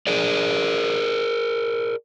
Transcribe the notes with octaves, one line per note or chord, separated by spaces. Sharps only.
G#4 A#4 D5